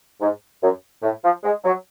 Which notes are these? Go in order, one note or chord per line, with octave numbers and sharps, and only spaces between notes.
G#2
F#2
A2
F3
G#3
F#3